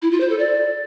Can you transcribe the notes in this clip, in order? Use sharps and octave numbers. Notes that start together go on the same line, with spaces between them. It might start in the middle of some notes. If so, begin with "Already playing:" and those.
E4
F4
C5
A4
D5